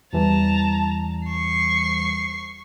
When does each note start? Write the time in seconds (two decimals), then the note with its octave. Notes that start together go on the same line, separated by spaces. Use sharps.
0.13 E2 E3 G3 A5 A#5
1.26 C#6 C7